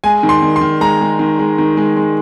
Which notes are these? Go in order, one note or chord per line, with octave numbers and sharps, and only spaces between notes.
G#3 G#5
D#3
C6
D#3
C6
D#3
G#3 A#5
G#3
D#3
G#3
D#3
G#3
G#3